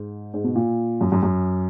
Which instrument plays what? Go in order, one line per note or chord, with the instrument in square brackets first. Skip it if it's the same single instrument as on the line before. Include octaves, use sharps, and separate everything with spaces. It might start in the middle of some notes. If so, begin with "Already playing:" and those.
Already playing: [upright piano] G#2
G#2
B2
A#2
F#2
F#2
F#2